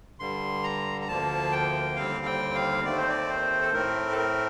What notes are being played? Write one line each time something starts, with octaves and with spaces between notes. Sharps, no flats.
G2 D3 G3 C6
A#5
A#5
D2 D3 F3 A#3 A5
G5
D#2 D3 G3 C4 F5
G5
F5
D#2 D#3 A3 C4 D5
C5
D5
C5
A4
A2 A3 C4 A#4
A4
A#4